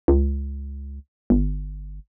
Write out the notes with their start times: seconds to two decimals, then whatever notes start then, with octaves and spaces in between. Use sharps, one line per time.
0.08 C#2
1.30 G1